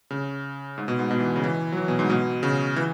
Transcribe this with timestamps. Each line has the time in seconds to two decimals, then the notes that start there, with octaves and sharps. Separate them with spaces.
0.11 C#3
0.78 G#2
0.88 B2
0.99 G#2
1.11 B2
1.19 E3
1.36 C#3
1.44 E3
1.72 F#3
1.77 E3
1.88 B2
1.99 G#2
2.10 B2
2.43 C#3
2.76 E3